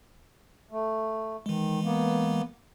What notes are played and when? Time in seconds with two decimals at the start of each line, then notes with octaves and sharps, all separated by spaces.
0.71 A3
1.46 D#3 E3 G#3
1.84 A#3 B3